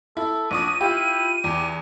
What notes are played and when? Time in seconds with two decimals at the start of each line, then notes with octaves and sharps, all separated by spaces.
0.17 E4 A4
0.51 A#1 D4 C#6 D#6 D#7
0.81 E4 F4 G4
1.44 E2 G4